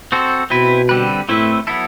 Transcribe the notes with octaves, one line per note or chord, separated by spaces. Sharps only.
C4 F#4 A4 C5
B2 C4 E4 B4
D3 G3 C4 G4 B4
A2 A3 C4 E4 B4
F#3 B3 E4 A4